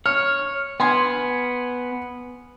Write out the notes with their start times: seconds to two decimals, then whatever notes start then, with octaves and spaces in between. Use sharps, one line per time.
0.06 C#5 F6
0.80 B3 G#5 C6 G#6